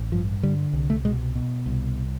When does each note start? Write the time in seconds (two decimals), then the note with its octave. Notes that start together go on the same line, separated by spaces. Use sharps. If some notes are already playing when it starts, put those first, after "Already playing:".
Already playing: A1
0.12 G2 F3
0.43 D3 G3
0.73 C2
0.90 A3
1.05 B2 G#3
1.35 B2
1.66 C2